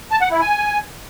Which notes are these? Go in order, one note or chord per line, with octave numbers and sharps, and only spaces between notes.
A5
F#5
E4
G#5